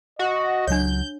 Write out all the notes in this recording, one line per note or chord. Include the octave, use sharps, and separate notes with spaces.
F#4 D#5 F#5
C#2 F#3 D4 C#5 G6